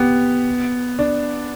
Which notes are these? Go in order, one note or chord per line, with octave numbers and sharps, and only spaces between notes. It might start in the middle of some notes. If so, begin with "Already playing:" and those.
Already playing: B3 G4
D4